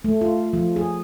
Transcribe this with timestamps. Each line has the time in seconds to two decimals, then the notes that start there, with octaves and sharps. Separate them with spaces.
0.04 A3
0.21 F4
0.53 F3
0.76 G#4